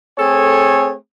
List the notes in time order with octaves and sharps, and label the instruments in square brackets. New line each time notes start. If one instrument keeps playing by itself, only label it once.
[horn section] A3 C4 G#4 A4 C#5 G#5